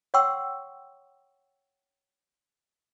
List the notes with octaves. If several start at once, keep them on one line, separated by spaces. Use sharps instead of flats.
C#5 F#5 G5 C6 C#6 E6